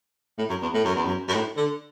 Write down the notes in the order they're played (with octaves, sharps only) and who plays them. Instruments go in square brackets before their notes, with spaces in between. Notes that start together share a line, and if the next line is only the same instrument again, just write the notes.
[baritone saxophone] A2
F#2
E2
A2
F#2
E2
F#2
F#2
A2
D3